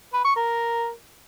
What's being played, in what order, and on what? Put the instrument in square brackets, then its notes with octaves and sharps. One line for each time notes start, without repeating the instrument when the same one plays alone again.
[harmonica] B4
C#6
A#4